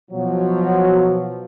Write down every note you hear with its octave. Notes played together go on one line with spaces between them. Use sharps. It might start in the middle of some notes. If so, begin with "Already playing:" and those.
B2 F3 F#3